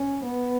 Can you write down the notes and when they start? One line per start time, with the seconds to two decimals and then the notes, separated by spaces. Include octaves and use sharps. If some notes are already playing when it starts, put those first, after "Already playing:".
Already playing: C#4
0.25 B3